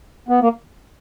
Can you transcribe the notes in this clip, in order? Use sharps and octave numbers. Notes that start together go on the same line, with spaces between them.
B3
A#3